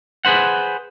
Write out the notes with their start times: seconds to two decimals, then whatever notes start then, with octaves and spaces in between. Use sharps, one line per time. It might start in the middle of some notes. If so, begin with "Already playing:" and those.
0.25 G#4 B4 C5 F#5